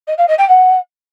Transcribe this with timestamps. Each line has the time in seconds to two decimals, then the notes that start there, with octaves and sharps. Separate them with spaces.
0.07 D#5
0.18 F5
0.28 D#5
0.38 G5
0.48 F#5